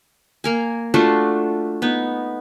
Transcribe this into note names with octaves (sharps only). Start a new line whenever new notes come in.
A#3 A#4 G#5
A3 D4 F4 F#4
B3 D#4